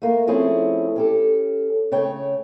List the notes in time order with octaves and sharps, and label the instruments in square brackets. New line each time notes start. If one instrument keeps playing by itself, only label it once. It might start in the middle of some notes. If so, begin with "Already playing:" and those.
[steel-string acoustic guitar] A3 A#3
F3 A3 C4 C#4 E4 G#4
C#4 G4 A4
C#3 A3 C#5 G5